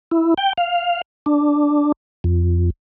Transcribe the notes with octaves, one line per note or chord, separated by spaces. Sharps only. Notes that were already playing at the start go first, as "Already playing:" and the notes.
E4
G5
F5
D4
F2